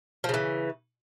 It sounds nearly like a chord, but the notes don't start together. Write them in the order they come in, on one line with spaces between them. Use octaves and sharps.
F3 C#3 E3